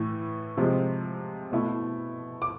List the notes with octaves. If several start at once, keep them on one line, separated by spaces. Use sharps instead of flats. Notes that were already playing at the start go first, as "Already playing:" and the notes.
Already playing: A2 E3 A3
C3 F3 G#3
B2 A3 E4
D6